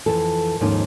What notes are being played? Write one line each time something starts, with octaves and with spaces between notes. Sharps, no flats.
F2 E3 A4
D#2 G#2 F3 A#3 C#4 D#4